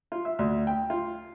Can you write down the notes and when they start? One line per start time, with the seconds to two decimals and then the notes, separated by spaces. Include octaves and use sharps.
0.12 F4
0.25 E5
0.39 D2
0.67 G5
0.90 F4